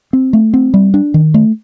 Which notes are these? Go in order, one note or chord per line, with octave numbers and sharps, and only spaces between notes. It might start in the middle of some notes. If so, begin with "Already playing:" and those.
C4
A3
C4
G3
D4
D#3
A3